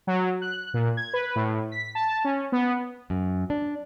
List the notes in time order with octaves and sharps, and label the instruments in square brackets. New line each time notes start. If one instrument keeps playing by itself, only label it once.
[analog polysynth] F#3
F#6
A#2
G#6
B4
A2
B6
A5
C#4
B3
[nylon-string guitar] F#2
D4